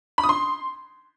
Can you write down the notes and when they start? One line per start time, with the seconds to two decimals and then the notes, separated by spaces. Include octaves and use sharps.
0.18 B5
0.23 D#6
0.29 C6